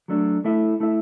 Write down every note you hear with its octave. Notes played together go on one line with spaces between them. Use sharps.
F#3 A3 D4
A3 E4 A4 E5
A3 E4 A4 E5